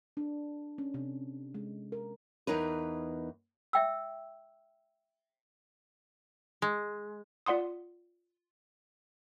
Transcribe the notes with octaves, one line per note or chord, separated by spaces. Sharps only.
D4
C#4
C3
G#3
A#4
E2 D#4 A#4 B4
E5 G5 E6
G#3
F4 D5 F#5 C6 D#6